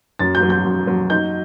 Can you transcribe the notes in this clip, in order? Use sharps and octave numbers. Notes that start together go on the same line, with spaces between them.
F#2 A6
G6
F#3
G6
F#2
F#3
D#4 G6